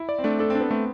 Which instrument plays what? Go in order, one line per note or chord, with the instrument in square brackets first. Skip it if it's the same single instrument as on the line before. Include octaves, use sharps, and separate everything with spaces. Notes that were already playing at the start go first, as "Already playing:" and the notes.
Already playing: [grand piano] E4
[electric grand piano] D5
[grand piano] C4
[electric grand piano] A3 [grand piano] D4
[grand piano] D4 [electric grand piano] A4
[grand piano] C4
[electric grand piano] D4
[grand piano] B3
[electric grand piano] A3 [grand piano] C4